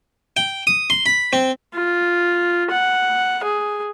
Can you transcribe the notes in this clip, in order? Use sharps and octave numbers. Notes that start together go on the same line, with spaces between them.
G5
D#6
C6
B5
C4
F4
F#5
G#4